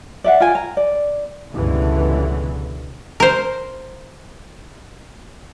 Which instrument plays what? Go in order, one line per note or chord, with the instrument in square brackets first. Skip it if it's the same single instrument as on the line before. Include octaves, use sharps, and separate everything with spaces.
[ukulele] D5 E5 F#5
F4 G5 G#5
A#5
D5
[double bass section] C#2 G2 B2 D3 E3
[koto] A#4 C5